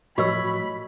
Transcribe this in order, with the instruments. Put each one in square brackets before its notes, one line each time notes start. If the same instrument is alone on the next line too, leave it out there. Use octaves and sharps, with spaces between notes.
[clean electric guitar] A2 F3 F#3 [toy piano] F#4 D#5 E6 [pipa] C#5 [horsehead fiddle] B5